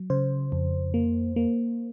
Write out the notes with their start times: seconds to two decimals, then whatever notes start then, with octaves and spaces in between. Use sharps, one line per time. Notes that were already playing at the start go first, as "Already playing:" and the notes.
Already playing: F#3
0.10 C#3 C5
0.52 F2
0.94 A#3
1.36 A#3